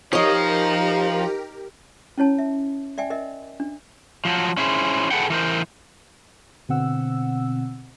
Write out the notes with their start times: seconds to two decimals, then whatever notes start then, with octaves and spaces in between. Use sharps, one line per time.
0.13 F3 D#4 G4 A#4 C#5 D#5
2.18 C#4 E4 C#5 A5
2.39 E5
2.98 D5 E5 G5 G#5
3.10 A#4 D#5 E5
3.60 D4
4.25 F3 F#3
4.57 C#4 E4 G#4 C5
5.11 G#4 A4 B4 F#5 G5
5.30 E3 A#4 C5
6.69 B2 D3 C4 F#5 E6